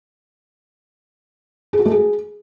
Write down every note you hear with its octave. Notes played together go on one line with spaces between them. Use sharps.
G#4
F#4
A3
G#4